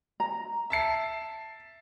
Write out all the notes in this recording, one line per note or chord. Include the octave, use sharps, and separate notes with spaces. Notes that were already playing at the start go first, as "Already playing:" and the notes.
A#5
E5 A5 C7